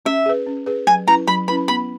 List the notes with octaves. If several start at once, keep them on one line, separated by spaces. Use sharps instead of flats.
C#4 E5
G#4 B4
C#4
G#4 B4
F#3 G#5
C#4 E4 B4 A#5
F#3 B5
C#4 E4 B4 B5
B3 B5